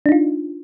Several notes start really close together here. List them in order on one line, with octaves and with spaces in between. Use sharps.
D4 D#4 F4